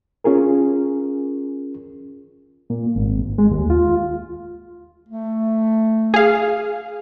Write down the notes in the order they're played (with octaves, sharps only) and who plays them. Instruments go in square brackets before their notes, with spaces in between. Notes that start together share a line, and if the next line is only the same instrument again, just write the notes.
[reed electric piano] C#4 F4 G#4 A#4
[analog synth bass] A#2
G#1
G#3
D#2
F4
[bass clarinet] A3
[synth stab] G#4 F5